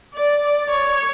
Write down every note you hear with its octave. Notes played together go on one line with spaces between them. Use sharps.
D5
C#5